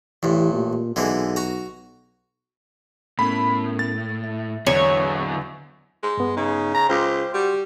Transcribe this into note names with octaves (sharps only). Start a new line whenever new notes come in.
A1 G2 E3
A#2
B1 D3 E3 G#3
F#4 A#5
A2 B3 C#4 A#4 B5
A6
E5
E2 D3 F#3 C#5
G#3
G2 B3
C#3 D#4
A#5
C#2 C5 G5 C6 D6
G3 F#4